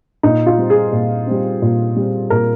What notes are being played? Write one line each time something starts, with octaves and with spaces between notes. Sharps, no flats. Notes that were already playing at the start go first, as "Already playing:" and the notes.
A#2 D#4
F4
G3 C4
G#4
A#2
G3 C4
A#2
G3 C4
A#2 A#4